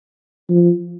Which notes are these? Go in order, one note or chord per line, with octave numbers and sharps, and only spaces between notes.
F3